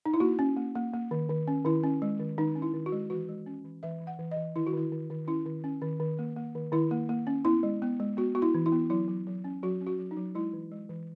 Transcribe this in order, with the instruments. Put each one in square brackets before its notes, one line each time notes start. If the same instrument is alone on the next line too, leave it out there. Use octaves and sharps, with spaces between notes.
[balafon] D#4
E4
A#3 F#4
C#4
A#3
A#3
A#3
D#3
D#3
C#4
D#3 E4
C#4
G#3
D#3
D#3 D#4
C#4
E4
D#3
F#4
G#3
E3 F#4
G#3
C#4
E3
E3 E5
E3
F#5
E3
D#5
E3
D#3 E4
F#4
D#3 E4
D#3
D#3
C#4 E4
D#3
C#4
D#3
D#3
A#3
A#3
D#3
D#3 E4
A#3
A#3
C#4
B3 E4
G#3
B3
G#3
B3 F#4
B3 F#4
E4
E3
E4
B3
F#3 E4
F#3
F#3
C#4
F#3 F#4
C#4
F#4
F#3
D#4
F#3
G#3 E4
E3
G#3
E3